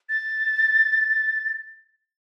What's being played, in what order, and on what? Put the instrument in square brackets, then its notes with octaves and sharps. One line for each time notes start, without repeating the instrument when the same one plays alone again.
[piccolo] A6